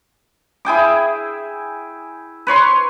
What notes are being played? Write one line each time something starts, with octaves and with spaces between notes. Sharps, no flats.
E4 G#4 G5 D6
B4 C#5 C6 C#6